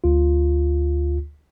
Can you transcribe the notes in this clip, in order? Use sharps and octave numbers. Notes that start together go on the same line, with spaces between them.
D2 F4